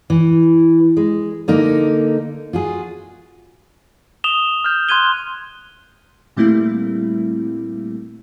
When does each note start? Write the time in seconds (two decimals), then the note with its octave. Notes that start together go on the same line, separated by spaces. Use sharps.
0.10 E3
0.97 G#3
1.48 D3 A#3 D#4
2.53 F4 F#4 G#4
4.24 D#6 E7 F7 G7
4.64 F6 G6
4.89 C6 F#6 G#6 D#7 G7
6.37 A#2 G3 A3 A#3 C4 E4